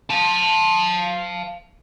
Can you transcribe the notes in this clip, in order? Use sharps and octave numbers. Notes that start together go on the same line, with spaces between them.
F5 A5